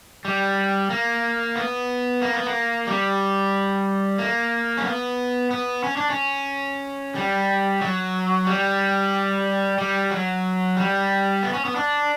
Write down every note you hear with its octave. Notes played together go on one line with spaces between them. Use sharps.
G3
A#3
B3
A#3
B3
A#3
G3
A#3
C#4
B3
B3
C#4
D4
C#4
G3
F#3
G3
G3
F#3
G3
B3
C#4
B3
D4